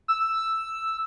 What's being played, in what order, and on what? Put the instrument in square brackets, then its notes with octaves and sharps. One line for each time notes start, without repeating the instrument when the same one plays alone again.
[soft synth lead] E6